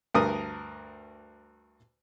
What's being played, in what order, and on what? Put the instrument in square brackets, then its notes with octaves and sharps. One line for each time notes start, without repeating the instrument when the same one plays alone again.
[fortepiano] D2 G2 A#4 D#6